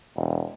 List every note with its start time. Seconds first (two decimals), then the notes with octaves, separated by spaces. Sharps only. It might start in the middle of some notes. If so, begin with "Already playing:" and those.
0.16 E1